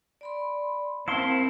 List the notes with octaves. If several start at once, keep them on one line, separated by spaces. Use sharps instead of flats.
D5 B5 C6
C4 E4 A#4 E5 F5 A5 C6